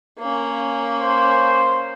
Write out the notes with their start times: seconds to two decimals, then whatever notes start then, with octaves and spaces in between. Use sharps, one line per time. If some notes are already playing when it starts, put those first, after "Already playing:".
0.19 A#3 C#4
1.00 C5